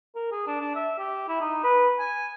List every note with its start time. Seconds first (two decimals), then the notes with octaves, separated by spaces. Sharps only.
0.15 A#4
0.32 G#4
0.47 D4
0.61 D4
0.76 E5
0.98 G4
1.28 E4
1.41 D#4
1.64 B4
1.99 G#5